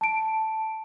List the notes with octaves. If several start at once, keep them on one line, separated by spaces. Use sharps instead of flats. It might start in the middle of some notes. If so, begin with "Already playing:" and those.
A5 D7